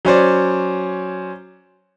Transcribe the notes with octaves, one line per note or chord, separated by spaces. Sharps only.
F#3 C#4 C5 D5